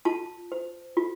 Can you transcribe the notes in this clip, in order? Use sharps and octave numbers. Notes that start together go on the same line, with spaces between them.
F4 A5
C5
F4